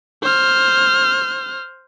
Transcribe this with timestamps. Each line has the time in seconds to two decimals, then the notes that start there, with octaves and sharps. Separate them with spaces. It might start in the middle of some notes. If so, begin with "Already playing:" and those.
0.23 C5 F6